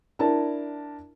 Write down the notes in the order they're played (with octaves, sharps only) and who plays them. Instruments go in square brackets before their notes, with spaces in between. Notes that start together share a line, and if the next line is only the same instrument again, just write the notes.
[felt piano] D4 E4 A#4 A5